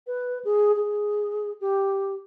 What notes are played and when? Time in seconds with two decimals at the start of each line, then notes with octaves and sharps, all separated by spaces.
0.07 B4
0.45 G#4
0.76 G#4
1.61 G4